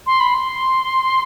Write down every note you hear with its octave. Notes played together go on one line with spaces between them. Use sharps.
C6
B5
C6